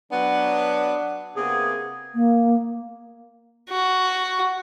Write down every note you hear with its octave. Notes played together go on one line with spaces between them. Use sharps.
F#3 B3 D4
C3 A#3 B3 G#4
A#3
F#4